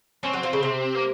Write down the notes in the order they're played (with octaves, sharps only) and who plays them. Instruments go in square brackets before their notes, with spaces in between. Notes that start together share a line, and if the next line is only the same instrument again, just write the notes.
[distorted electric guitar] C4 [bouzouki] C#4
[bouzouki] F#3
F3
C#3
C3
[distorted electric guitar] A#3